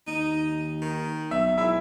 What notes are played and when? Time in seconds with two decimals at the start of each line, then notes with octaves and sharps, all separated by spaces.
0.07 D#2 D#4
0.82 D#3
1.31 B1 E5
1.58 G#2 E4 E5